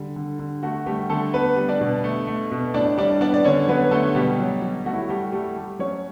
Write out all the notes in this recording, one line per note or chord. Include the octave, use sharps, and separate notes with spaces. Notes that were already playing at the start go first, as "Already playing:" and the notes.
Already playing: D3 G3
D3
D3
A3 F#4
G3 A3 G4
D3 A3 A4
G3 B3 B4
G3
D4 D5
B2
A3
A3
B2
A2 D4 D5
G3 D4 D5
B3 D4 D5
D5
D3 C#4 C#5
F#3 B3 B4
D3 A3 A4
B2 G3 G4
F#3
F#3
A3 F#4
E4
F#4
G3 A3 G4
G3 A3 G4
A3
F#3 C#4 C#5